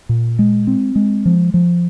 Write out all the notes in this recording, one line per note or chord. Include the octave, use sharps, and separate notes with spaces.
A#2
G#3
C4
G#3
F3
F3